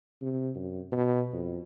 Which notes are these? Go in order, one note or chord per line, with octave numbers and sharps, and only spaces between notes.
C3
F#2
B2
F2